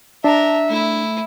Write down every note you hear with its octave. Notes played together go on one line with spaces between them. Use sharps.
D4 A#4 E5 A5
A3 E4